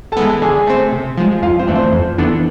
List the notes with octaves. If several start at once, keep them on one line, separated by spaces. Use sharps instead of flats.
A4 A5
E3 G#3 B3
D3 G#4 G#5
A3 C4
C3
F3 G#3
F2 F4 F5
C4 C5
E3 A3 D4
C4 C5
F2
E3 B3 D4 A4